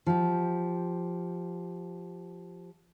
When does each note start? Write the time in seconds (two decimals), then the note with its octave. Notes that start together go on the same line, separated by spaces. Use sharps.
0.06 F3 G4